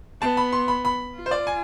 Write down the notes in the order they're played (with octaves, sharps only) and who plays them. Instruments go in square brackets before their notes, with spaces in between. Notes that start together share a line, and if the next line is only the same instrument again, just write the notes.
[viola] B3 [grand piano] A5
[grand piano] B5
C6
B5
B5
[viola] F4
[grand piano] C5
D5
G#5